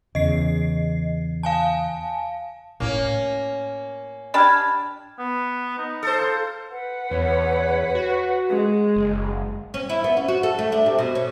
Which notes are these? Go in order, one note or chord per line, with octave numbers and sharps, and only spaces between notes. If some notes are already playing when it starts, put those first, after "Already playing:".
E2 C#3 D#5 C7
F5 G#5 A5
A2 A#3 C#4 E4
D4 G4 A5 B5 F6 G#6
B3
D#4
A4 C5
F4
B4 F#5
E2 C#5
F#4
G#3
F#1
C#4
E4
B3
C#4
F#4
A4
A3
D4
C3
B2
C#4